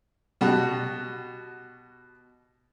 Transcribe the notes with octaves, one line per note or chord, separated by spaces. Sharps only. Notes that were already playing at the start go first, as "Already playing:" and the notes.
B2 F#4 G4 F#5 A5